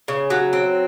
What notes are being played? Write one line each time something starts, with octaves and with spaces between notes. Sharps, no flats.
C#3
F#3
C4